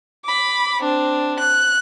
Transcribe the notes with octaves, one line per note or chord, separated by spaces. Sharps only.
B5 D6
C4 D4
F#6